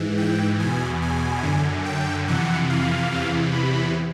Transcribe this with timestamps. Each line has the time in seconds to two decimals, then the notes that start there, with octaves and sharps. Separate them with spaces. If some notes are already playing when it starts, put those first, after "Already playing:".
Already playing: G#2 E3
0.17 G5
0.59 E2 B2 G#5
1.02 G#5
1.43 F#2 D3
1.85 G5
2.28 F2 C3 E3 F#5
2.69 F5
3.12 E2 C3 E3
3.52 B5